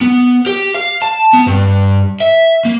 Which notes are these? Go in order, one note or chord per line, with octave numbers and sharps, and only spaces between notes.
B3
G4
F5
A5
B3
G2
E5
A#3